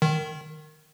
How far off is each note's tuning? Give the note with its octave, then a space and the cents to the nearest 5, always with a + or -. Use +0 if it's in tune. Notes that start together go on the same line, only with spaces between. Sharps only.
D#3 -15